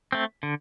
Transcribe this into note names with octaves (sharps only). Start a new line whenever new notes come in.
A3 C4
D3